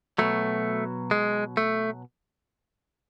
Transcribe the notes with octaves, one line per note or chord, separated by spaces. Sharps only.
B2 F#3 A3
G#3
A3